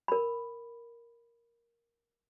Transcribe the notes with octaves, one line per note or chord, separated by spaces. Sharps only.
A#4 B5